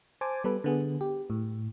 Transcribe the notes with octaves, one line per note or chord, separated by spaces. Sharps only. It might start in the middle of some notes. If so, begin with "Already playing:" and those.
C5 G#5 A5 D6
G3 B3 A4 B4
D3 B3 G#4
G4
A2